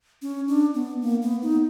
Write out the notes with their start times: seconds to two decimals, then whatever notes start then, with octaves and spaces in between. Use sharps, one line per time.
0.22 C#4
0.48 D4
0.75 B3
1.02 A#3
1.22 B3
1.42 D#4